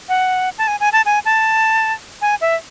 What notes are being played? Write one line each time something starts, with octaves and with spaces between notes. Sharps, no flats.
F#5
A5
G#5
G#5
A5
G#5
A5
G#5
E5